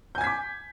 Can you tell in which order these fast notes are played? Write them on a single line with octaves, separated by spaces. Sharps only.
G6 G#5 G#6 B6 D6